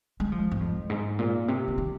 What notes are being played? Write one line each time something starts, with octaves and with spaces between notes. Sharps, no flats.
G#3
F3
G#2
F2
G#2
A#2
C3
F3
D#3